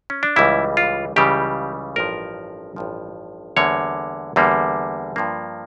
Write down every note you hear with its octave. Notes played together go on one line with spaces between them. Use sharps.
C#4
D4
C#2 C#3 E3 G3 E4
F4
C#2 C#3 E3 G3 G4
A1 G2 F3 A#4
A1 G2 F3
E2 D3 G3 A#3 C#5
E2 D3 G3 A#3
G2 F3 A#3